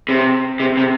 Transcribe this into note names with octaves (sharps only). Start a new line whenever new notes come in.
C3
C3
C3